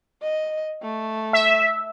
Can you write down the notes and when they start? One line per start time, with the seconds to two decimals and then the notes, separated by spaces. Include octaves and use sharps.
0.22 D#5
0.82 A3
1.33 E5